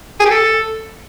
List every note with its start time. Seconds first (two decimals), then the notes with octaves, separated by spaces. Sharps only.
0.20 G#4
0.25 G4
0.31 A4